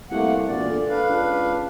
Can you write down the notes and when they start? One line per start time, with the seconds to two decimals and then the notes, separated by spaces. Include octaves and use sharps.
0.11 C2 A3 A#3 F#5
0.48 E1 A#2 D5
0.68 D3
0.89 D4 B4 F5
1.09 C#2